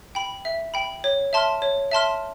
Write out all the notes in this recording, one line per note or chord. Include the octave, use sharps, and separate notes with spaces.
G5 B5
E5
G5 B5
C#5
E5 A5 C6 F6
C#5
E5 A5 C6 F6